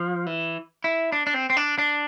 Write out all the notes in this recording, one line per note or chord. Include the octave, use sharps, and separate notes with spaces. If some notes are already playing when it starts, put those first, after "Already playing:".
Already playing: F3
E3
E4
D4
D4
C4
C4
D4
D4